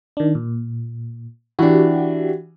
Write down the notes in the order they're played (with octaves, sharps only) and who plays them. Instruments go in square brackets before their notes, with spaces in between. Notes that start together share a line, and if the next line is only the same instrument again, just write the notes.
[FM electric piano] D#3 D4
A#2
[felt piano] E3 D4 [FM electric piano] F#4 G4